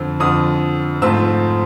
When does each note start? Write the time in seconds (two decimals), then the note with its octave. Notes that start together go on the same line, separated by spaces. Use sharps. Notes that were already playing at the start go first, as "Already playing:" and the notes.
Already playing: F2 D3 F3
0.20 F2 D3 F3 D#6
1.02 G#2 F3 A3 C4 F4 E6